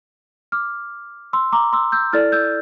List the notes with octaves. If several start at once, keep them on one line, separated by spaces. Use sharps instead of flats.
D6 F6
C6 E6
A#5 D6
C6 E6
E6 G6
E4 A4 D5 F6 A6
E6 G6